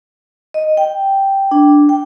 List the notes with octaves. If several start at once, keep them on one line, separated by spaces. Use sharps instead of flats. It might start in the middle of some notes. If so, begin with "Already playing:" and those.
D#5
G5
D4
G5